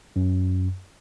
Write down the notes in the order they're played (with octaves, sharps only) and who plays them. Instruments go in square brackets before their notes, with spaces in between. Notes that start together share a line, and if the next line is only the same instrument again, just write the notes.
[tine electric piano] F#2